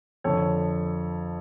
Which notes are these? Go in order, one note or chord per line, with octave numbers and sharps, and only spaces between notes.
F2 D3 A4 C#5